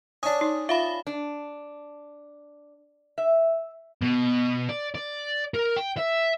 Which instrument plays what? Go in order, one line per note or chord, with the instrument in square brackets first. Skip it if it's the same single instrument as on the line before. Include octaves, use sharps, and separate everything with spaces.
[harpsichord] C#4 D4 [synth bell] D#6
[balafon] D#4
[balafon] F4 [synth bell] E5 F5 B5
[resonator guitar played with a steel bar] D4
E5
[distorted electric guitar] B2
D5
D5
A#4
G5
E5